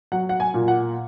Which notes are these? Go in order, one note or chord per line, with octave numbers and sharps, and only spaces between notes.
F#3 F#5
F#5
G#5
A#2
F#5